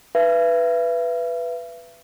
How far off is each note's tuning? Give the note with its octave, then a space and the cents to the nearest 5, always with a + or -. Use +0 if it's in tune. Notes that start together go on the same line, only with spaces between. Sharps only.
B4 +0 E5 +40